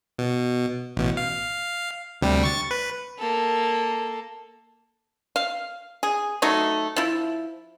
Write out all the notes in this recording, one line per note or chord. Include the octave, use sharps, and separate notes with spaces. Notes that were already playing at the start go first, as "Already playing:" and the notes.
B2
A1 B2
F5
D2 C3 G3
C#6 A6
B4
A#3 A4
F5
G#4
F#3 A3 D#4
F3 E4